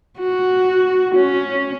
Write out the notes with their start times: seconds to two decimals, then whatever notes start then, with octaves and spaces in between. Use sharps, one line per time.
0.19 F#4
1.15 C#4